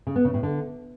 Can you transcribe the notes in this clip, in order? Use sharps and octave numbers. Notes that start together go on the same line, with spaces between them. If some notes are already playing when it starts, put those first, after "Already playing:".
C#3
B3
C#3
A2
D3